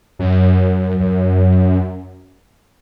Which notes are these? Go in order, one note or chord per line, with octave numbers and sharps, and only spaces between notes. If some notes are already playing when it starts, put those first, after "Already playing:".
F#2
F#2